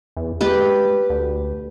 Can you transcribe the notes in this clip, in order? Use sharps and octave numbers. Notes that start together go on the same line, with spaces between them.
E2
G#3 G4 B4
D2